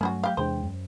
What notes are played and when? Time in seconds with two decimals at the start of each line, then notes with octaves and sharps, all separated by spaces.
0.01 G2 F#3 A3 C#4 E4 F#4
0.23 G4 F5
0.37 E2 C3 E3 G#3 D4 C5 G5
0.63 F#2